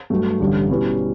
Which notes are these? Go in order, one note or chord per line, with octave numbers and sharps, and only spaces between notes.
G2 F#3 A3
A1 G2 D3 G3
B2 G3 C#4 E4 B4